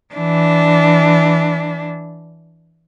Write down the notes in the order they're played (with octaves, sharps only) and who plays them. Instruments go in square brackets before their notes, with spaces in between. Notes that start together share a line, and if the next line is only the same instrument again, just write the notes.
[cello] E3 D4